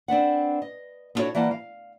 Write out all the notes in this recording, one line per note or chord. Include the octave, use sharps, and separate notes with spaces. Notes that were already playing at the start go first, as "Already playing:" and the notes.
C4 D4 B4 F#5
D#5
B3 D4 E4 F#4 A4 C#5
E3 G3 A#3 F#5 A5
F5